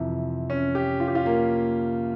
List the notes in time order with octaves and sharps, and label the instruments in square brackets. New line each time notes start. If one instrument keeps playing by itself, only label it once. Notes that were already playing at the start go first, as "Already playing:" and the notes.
Already playing: [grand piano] F2 C3 E3
C#4
G4
F4
G4
F4
A#3